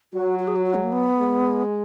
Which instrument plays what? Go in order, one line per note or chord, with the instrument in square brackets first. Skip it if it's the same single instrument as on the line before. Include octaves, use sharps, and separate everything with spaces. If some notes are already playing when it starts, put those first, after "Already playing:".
[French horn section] F#3 [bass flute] F#4
[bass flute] F#4
G#4
F#4
F#4
G#3
A#3
B3
[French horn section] G#3